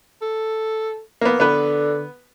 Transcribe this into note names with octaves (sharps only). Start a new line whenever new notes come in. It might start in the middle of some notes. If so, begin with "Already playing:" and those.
A4
A#3 B3
D3 B3 B4